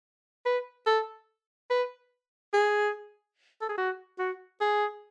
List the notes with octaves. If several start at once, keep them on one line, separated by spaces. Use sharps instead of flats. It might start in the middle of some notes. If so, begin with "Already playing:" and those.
B4
A4
B4
G#4
A4
G#4
F#4
F#4
G#4